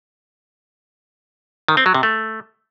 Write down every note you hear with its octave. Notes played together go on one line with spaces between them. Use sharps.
D#3
C4
F#3
C3
A3